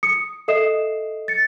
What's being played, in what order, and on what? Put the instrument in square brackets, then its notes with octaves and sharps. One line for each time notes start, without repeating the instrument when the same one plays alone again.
[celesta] D#6 C#7
A4 D#5 E5 D#6 C7 E7
A6 C#7